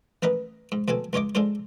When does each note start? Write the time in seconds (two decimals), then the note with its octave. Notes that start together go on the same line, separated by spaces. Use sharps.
0.22 A1 A#4 B4 D#5
0.72 G#2
0.88 D2 B2 C4 A4 G#5
1.13 C#2 F4 C#5 D#5 D6
1.35 G#3 D4 F4 A4 C5